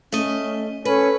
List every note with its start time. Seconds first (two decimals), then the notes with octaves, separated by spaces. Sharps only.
0.12 A3 C#4 D#5
0.85 C#4 A4 B4